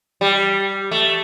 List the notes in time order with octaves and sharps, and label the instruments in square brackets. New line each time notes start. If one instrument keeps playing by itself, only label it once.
[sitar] G3
A3